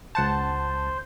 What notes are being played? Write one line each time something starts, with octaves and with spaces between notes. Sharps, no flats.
C#2 C5 F#5 A5